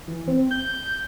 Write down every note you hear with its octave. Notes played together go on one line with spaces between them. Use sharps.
E3
C4
G6